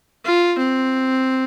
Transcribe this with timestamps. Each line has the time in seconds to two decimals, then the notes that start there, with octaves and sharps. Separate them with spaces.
0.25 F4
0.59 C4